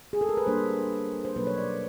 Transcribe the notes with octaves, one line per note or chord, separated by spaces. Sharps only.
G#4
A4
A#4
B4
G3 A#3 D4 C5
C5
B2 F#3 A#3 C#4 B4
C#5
D5